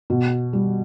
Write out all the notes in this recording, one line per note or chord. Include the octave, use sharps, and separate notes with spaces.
B2
G3